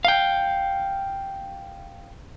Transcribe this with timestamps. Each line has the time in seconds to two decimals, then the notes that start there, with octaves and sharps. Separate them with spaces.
0.05 F5 G5